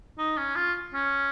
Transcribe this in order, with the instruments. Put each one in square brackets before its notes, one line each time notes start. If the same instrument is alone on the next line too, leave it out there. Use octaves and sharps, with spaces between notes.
[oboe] D#4
C#4
F4
C#4